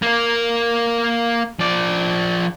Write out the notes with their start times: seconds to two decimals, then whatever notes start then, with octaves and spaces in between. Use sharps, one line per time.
0.02 A#3 A#4
1.60 F3 D5